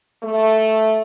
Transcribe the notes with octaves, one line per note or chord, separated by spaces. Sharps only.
A3